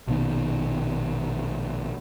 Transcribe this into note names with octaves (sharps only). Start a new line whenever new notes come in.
A#1 B2 D#3